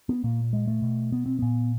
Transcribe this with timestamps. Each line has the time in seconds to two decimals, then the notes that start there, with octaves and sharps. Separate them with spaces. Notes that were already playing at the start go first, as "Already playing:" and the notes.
0.09 B3
0.24 A#2 A#3
0.53 G#3
0.68 A3
0.82 B2
1.12 B3
1.26 C4
1.39 A#2 B3